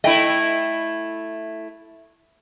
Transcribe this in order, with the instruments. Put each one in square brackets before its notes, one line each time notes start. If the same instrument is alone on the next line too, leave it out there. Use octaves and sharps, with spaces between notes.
[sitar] A3 E4 [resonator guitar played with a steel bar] D#5 E5 G5